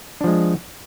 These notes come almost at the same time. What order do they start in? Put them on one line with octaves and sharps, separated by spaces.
D4 F3 G#3